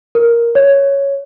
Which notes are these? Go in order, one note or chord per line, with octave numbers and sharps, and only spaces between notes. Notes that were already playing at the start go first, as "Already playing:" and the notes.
A#4
C#5